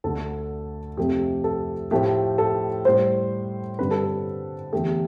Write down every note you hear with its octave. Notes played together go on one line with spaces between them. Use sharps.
D2 D3 A3 A4
F2 C3 F3 A3 G4
A4
A2 F3 A3 G4
A4
A2 G3 C5
G2 D3 G3 B4
A4
B4
E2 D3 A3 G4